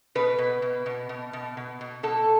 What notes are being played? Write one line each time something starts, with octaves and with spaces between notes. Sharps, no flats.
B2 B4
B2
B2
B2
B2
B2
B2
B2
B2 A4